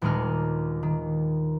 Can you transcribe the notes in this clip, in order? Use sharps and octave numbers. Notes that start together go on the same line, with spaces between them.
D#1 D#2 G#3 D4 D#4 F6
D#3